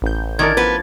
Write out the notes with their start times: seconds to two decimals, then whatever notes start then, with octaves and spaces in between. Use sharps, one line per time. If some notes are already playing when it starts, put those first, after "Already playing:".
0.02 A1 G6
0.39 D#3 E3 D4 A#4 G#6 A6
0.57 F3 B3 B4